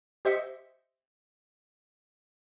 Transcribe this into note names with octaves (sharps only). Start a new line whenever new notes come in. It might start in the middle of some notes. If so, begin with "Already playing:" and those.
G4 C5 D#5 E5 B6 C#7